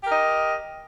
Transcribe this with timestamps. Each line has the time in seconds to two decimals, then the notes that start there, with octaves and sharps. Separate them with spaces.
0.03 G4
0.07 A#4
0.11 D#5